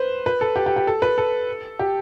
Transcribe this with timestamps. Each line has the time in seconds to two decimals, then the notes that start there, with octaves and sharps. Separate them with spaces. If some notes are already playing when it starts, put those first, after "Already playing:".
Already playing: B4 C5
0.26 B4
0.41 A4
0.56 G4
0.66 G4
0.76 G4
0.87 A4
1.02 B4
1.18 A4
1.79 G4